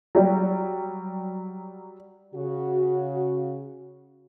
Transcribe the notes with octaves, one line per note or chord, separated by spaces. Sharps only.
F#3 G3
C#3 F#4